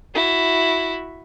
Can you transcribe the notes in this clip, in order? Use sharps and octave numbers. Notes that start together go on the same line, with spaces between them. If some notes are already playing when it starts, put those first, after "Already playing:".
E4 F#4